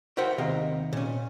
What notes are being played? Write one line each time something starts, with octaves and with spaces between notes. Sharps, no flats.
F#4 A#4 C5 E5 F#5 G5
D#2 C3 D#5 F5
A#2 C#4